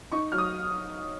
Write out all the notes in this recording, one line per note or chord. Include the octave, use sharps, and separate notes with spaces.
D#4 C#6
F#3 F6
D#6